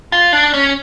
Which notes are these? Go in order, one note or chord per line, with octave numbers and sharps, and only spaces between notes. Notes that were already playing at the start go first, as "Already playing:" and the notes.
F4
D4
C#4